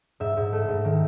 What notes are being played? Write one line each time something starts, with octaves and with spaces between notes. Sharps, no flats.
G#2 E5
G#2
A3
G#2
D#3